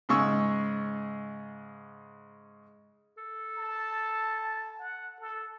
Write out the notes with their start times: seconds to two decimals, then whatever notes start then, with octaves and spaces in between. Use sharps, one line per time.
0.09 G#2 C#3 G#3 C#6 E6
3.17 A4
3.57 A5
4.79 F#5
5.20 A4